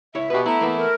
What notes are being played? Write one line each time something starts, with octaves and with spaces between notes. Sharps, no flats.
C#2 E4 C#5 E5
B2 G4 B4
A3 B3 E4 A#5
E3 A#3 B3
A#4